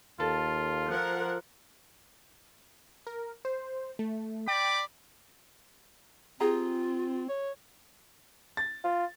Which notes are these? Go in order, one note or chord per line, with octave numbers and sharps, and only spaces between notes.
D#2 F4 A4
F3 A#4 F#5
A#4
C5
A3
D5 G5 B5 D6
C4 F4 G4 G#4 A#5
C#5
A6
F4